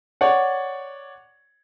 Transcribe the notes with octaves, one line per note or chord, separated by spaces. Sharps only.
C#5 D5 F#5